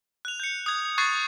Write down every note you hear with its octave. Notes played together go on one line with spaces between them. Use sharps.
F#6 F7
G6 C#7
D#6 G#6
C#6 F#6 G#6 A6 C7